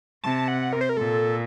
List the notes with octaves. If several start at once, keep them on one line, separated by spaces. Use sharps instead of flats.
C3 A5
F#5
A#4
C5
A#4
A#2 A4